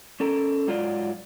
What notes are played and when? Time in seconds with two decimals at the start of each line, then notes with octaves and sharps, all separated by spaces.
0.20 C#4 A4 A#4
0.68 G#2 F#3 F4 D5